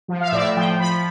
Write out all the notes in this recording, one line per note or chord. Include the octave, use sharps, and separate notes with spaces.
F3
F5
E5
A2 D5
E5
F3 G5
F3 B5